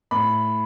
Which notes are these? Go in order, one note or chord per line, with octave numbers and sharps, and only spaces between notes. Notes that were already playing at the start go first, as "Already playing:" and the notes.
A2 B5